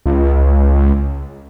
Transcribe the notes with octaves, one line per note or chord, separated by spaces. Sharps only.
C#2